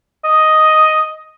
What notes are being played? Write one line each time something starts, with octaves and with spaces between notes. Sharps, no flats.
D#5